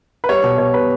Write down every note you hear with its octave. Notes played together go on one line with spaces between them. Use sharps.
B4
G3 C#5
B2
B2 C#5
G3 B4